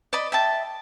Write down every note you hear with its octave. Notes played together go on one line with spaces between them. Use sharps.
D5 D#5 B5
E5 G5 A5